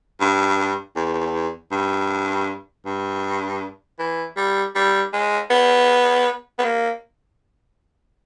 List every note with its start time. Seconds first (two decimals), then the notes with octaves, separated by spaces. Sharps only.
0.21 G2
0.96 E2
1.72 G2
2.85 G2
3.99 E3
4.37 G3
4.75 G3
5.13 G#3
5.50 B3
6.59 B3
6.64 A#3